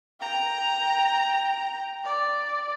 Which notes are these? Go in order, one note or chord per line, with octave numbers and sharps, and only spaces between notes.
G5 A#5
D5